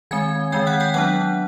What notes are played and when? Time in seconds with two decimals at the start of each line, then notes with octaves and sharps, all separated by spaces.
0.11 D#3 G#3 C4 G#5 G#6
0.52 D#3 G#3 C4 G5 G6
0.67 F#5 F#6
0.80 G5 G6
0.94 F#3 B3 D4 F#5 F#6